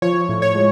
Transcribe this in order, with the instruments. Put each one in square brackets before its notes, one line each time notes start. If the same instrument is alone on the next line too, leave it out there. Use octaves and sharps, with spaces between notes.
[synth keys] F3 C#5
A2
C#5
G#3